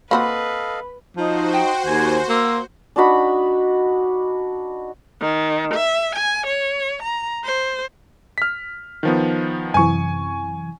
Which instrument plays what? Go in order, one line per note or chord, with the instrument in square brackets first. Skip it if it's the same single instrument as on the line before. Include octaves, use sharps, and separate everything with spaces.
[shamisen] A#3 C4 F#4 [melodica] A4 D#5 F5 [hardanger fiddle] B4 [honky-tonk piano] B5
[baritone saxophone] F3 [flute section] D#4 [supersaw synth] F#4 C5
[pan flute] G5
[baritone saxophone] D#2 [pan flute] G#5 [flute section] G#6
[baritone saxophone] A#3 [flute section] C6 [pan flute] E6
[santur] D4 D#4 F#4 B5
[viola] D#3
E5
G#5
C#5
A#5
C5
[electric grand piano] F6 B6
D#3 F3 B3
[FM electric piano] F#2 C3 E3 [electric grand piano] G#5 C#6